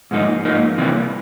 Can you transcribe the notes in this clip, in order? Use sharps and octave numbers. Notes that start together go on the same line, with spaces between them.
G#2 F3 A#3 D#4
G#2 F3 A#3 D#4
C3 E3 G3 A#3 D4